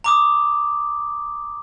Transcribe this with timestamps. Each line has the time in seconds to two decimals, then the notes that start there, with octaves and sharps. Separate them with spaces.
0.04 A#5 D6 D#6